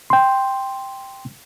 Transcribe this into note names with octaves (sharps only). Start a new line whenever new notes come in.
G5 C6